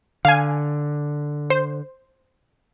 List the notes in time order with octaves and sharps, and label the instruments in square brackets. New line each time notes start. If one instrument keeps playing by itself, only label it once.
[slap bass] D3 [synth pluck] F5 G#5
[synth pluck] C5